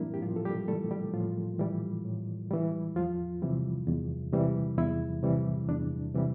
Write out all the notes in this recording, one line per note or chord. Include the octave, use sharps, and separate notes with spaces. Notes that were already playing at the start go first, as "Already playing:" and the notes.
Already playing: A2 E3 G3 A#3 C4 D4 E4 A#4
G4
A2 F3 F4
A4
G3 G4
E3 G3 A3 A4
G3 G4
A2 F3 F4
E3 G3
A2
E3 G3
E2 F3 F4
C3 E3 G3
E2
C3 E3 G3
E2 E4
C3 E3 G3
E2 D4
C3 E3 G3